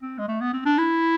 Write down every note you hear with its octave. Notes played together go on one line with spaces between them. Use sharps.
C4
G#3
A3
B3
C4
D4
E4